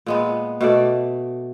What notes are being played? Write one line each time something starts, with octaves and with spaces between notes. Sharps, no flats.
A#2 G#3 B3
B2 A3 D5